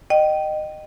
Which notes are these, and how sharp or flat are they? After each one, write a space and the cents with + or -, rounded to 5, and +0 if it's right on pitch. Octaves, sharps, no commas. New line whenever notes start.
D#5 -20 G5 -20